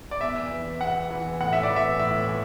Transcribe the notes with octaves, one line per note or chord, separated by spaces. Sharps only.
D5
E2 E5
E3
E2 F#5
E3
A2 F#5
E5
D5
E3
E5
A2 E5
E3